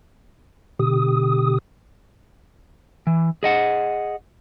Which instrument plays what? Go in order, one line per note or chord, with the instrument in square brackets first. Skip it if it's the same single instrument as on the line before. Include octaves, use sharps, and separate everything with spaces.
[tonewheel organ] B2 D3 G4 D#6
[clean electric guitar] E3
G#4 D#5 F#5